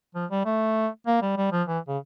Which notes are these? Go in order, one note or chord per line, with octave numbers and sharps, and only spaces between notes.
F3
G3
A3
A#3
G3
G3
F3
E3
C#3